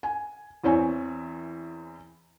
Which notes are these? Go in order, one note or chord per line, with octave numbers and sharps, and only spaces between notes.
G#5
E2 E3 C4 C#5 G#5